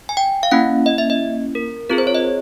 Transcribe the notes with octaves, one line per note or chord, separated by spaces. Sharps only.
G#5
G5
F5
A#3 C#4 E4 F#5
D#5
E5
D#5
A#4
C4 F4 G#4 A#4
C5
C#5
D#5